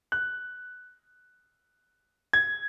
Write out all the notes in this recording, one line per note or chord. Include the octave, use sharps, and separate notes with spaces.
F#6
G#6